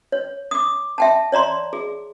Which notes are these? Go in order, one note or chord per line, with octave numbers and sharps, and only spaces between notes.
C#5
D6 D#6
E5 G5 A5
C#5 D5 A#5 C6
G#4